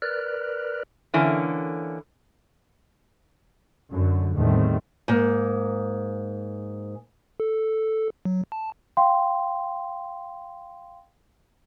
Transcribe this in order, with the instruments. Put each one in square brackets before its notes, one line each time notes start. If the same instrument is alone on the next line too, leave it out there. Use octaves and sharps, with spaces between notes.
[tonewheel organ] A#4 B4 D5 F6 F#6
[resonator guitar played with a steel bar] D3 E3 A#3 C#4
[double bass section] F#2 D3
E2 A2 D#3 G3 A3 C4
[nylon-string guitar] G#2 A#3
[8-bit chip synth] A4
F#3
A5
[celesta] F5 G5 C6